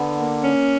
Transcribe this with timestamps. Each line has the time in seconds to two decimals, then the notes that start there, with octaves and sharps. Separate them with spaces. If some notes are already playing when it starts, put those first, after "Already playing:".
Already playing: D3 B3
0.15 A#3
0.40 C#4